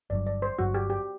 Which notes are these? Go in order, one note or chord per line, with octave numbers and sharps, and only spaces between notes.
G1 G2 F#3 D5
D5
C5
G1 G2 F#3 F#4
G4
G4